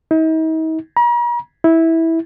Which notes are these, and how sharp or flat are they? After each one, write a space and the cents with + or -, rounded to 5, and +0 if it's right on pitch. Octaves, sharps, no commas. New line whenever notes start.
D#4 +40
A#5 +45
E4 -15